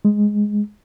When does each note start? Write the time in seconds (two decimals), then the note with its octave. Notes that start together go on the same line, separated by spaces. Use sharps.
0.05 G#3